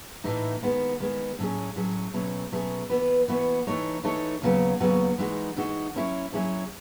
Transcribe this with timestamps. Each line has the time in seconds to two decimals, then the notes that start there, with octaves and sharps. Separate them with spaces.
0.24 A2 E3 A3 D#4
0.62 D#3 G#3 B3
1.00 D#3 G#3 B3
1.39 A2 F#3 C#4 G#4
1.76 A2 F#3 C#4 G#4
2.14 B2 F#3 A3 C#4 G#4
2.52 B2 F#3 A3 C#4 G#4
2.90 E3 B3 F#4 B4
3.28 E3 B3 F#4 B4
3.67 E3 A3 D#4 A4 C#5
4.04 E3 A3 D#4 A4 C#5
4.42 D#2 C#3 F#3 B3 F#4
4.80 D#2 C#3 F#3 B3 F#4
5.18 E3 G#3 D#4 F#4
5.56 E3 G#3 D#4 F#4
5.94 F#3 C#4 E4 G#4 C#5
6.33 F#3 C#4 E4 G#4 C#5